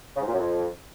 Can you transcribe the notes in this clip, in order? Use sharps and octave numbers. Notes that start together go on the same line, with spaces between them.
C#3
G#2
A#2
F#2
F2